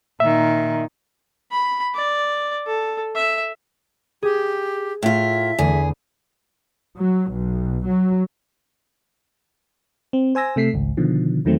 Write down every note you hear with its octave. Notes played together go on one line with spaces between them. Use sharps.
A#2 D#3 E5
B5
D5
A4
E5
G4 G#4
A2 F4 E5
E2 D3 A3 G#4
F#3
B1
F#3
C4
C5 G#5 E6 A#6
C3 A3 B6 C7
G#1 C#2
B2 D3 D#3 F3
E2 D#3 F#3 A3 C4